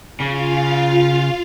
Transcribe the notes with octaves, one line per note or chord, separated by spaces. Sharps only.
C#3 F4 F5